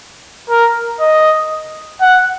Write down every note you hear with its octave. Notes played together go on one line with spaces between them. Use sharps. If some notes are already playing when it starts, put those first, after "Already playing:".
A#4
D#5
F#5